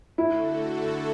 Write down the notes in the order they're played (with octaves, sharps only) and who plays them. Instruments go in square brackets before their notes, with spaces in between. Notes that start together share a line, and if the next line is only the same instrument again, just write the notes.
[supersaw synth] D3 A3 F#4 A4 [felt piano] E4